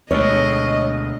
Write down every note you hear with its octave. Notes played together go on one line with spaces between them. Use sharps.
D2 B2 G#3 A3 C#5 D#5